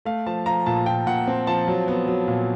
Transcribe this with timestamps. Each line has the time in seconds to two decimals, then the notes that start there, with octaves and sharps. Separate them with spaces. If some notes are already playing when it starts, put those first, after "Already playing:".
0.05 A3 F5
0.26 F3 A5
0.46 F3 A#5
0.66 A#2 A5
0.86 A#2 G5
1.06 A#2 F#5
1.27 C4
1.47 F3 A5
1.67 F#3
1.88 B3
2.08 F#3
2.28 A#2